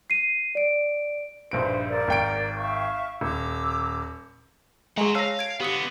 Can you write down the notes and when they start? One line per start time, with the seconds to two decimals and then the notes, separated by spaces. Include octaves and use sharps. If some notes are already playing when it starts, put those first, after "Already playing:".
0.10 C7 D#7
0.55 D5 D7
1.51 A#1 G2 D#4 B4 C5 D7
1.89 A#4 D5
2.08 G#1 G5 D7
2.57 E5 F5 C#6
3.21 D#1 A#5 D6 E6
4.98 G#3 G#4 F#5 G#5 A#5 C6 C#6
5.15 C#5 F5 A5 E6 A#6
5.39 G#6 D7
5.60 D3 B3 G4 D#6 C#7